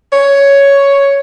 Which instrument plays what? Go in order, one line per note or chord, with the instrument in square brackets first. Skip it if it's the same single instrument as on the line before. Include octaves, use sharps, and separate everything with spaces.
[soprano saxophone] C#5